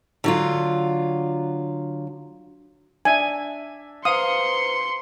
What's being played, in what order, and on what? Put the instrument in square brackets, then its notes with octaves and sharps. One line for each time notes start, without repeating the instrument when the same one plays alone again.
[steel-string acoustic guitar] D3 F#3 F4
[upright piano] D4 E5 [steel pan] G#5
[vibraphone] B4 C5 A#5 [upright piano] F5 [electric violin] C6 C#7 [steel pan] D#6